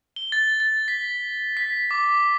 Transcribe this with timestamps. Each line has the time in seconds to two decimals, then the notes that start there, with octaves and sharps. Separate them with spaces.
0.16 G7
0.32 A6
0.60 A6
0.88 B6
1.57 B6
1.91 D6